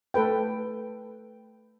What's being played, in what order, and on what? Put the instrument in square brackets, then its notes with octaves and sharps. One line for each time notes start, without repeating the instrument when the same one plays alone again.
[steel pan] A3 A4 B4 G5